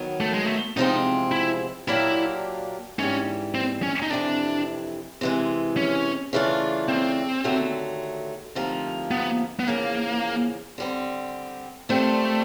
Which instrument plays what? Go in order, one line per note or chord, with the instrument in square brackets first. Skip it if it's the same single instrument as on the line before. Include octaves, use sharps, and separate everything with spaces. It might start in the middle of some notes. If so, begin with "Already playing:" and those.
Already playing: [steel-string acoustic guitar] D#3 F#3 B3
[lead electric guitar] A3
G#3
A3
[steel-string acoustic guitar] E2 C3 F3 G#3 C4 [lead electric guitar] D#4
[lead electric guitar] E4
[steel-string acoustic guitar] A#2 F#3 A#3 D4 G4 [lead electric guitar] E4
[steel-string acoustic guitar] G#2 E3 G3 [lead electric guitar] C#4
[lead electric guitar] C4
C#4
D#4
[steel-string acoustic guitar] F2 C3 E3 [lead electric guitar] D4
[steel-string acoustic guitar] C3 E3 G#3
[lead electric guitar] C#4
[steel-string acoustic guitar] C#3 E3 A3 D4 F4
[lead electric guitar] C4
[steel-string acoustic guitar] D#2 D3 F#3 A3
D2 C3 F3 A#3 D#4
[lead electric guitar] B3
B3
[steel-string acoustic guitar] E2 C#3 F3 [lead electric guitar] A#3
[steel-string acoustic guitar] D3 G3 C4
[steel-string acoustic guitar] A#2 G3 C4 [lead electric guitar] A3